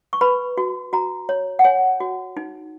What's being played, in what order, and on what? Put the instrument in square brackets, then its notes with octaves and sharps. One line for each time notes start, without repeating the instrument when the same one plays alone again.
[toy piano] C#6
B4 B5
F#4
F#4 A#5
C#5
F#5
C#5 G#5
F#4
D#4